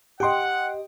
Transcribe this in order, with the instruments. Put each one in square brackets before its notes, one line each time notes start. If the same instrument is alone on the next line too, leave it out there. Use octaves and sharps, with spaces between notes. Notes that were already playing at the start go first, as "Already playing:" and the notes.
[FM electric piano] G4 D#5 [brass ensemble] F#5 [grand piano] G5 C6